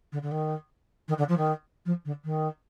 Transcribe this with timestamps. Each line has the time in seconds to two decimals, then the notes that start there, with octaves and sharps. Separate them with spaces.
0.12 D3
0.22 D3
0.31 D#3
1.08 D#3
1.18 D3
1.28 F3
1.37 D#3
1.85 F3
2.05 D3
2.24 D#3